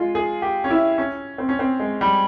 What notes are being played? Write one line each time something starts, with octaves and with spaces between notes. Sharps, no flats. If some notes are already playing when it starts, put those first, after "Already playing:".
Already playing: G#3 F4
G#4
G4
C#4
E4
C#4
C4
C#4
C4
G#3
G3